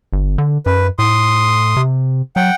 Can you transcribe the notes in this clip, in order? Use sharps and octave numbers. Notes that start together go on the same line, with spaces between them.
G1
D3
F#2 B4
A2 C6 D#6
C3
F#3 F#5 G5